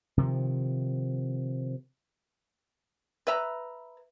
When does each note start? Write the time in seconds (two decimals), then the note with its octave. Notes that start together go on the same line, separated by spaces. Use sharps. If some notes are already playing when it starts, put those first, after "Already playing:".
0.17 C3 D#3 F3
3.27 B4 E5 A#5